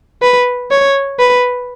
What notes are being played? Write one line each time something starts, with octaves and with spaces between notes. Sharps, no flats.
B4
C#5
B4